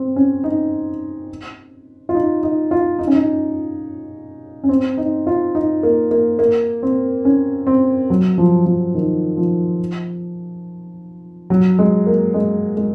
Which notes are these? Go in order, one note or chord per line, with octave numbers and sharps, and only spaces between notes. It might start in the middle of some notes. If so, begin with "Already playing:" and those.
Already playing: C4
C#4
D#4
F4
D#4
D#4
F4
D#4
C#4
D#4
C#4
C4
D#4
F4
D#4
A#3
A#3
A#3
C4
C#4
C4
F#3
F3
F3
D#3
F3
F#3
G#3
A#3
G#3
G#3